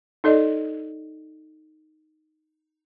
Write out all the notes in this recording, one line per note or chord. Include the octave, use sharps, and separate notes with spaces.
D#4 A4 D5 D#5